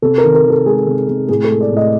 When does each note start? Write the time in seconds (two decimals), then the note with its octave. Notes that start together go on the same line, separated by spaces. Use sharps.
0.02 C3 A4
0.18 A#4
0.24 D#3
0.34 A#4
0.45 D#3
0.50 A4
0.66 G#3 G#4
0.87 C3
1.08 C3
1.29 A2 G#4
1.44 A4
1.50 G#3
1.61 D5
1.71 A2
1.77 D#5